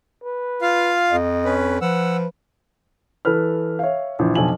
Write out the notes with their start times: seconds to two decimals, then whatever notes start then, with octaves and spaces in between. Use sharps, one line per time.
0.24 B4
0.62 F4 F5
1.11 F2 D#5
1.45 C#4 B4
1.81 F3 B4 F#5 E6
3.25 E3 A4 B4 F6
3.79 C#5 E5 F5
4.19 A#1 E3
4.35 B1 F2 B2 G#5 F#7